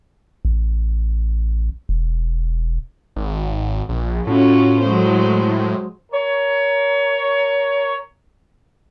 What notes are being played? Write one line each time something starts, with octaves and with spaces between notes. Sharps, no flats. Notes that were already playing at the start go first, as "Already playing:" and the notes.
A1
E1
G#1
A#1
A2 C#4 F4 F#4
F#3 G#3 C5
A#4 C#5